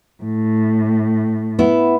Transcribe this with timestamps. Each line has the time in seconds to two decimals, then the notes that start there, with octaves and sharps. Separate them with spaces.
0.23 A2
1.59 B3 E4